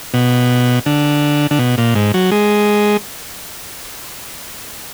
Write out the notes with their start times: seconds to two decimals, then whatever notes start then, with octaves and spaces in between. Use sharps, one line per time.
0.14 B2
0.86 D3
1.51 D3
1.59 B2
1.78 A#2
1.95 G#2
2.14 F#3
2.32 G#3